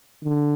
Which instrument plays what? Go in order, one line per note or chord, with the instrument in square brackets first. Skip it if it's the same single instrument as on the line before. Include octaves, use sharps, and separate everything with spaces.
[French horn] D3